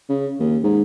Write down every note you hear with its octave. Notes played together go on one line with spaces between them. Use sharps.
C#3
D#2
G#2